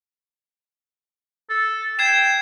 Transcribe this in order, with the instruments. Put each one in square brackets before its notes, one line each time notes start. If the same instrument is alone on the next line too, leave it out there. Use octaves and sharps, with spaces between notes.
[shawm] A4
[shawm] G5 [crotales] G#6 C7 E7